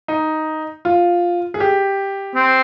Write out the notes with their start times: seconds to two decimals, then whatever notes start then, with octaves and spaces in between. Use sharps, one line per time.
0.08 D#4
0.85 F4
1.54 G#4
1.60 G4
2.35 C4